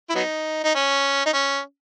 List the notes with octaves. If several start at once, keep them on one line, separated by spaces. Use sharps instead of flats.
E4
F#3 B3 D#4
D#4
C#4
D#4
C#4